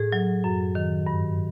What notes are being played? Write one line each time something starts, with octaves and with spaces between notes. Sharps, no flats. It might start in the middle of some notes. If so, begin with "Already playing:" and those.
Already playing: A2 G#4
F#3
F#2
D#3
G2